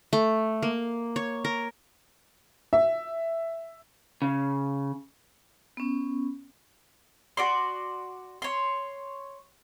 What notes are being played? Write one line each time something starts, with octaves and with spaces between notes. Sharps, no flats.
A3
A#3
C#5
A#4
E5
C#3
B3 C#4
F#4 D5 C6
C#5 C6